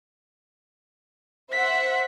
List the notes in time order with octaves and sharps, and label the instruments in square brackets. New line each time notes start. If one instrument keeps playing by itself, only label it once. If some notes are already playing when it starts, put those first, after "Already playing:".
[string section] C5 E5 F#5 [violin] B6